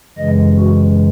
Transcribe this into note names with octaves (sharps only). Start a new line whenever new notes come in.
F#2 C#3 E3 G#3 D#5
F#4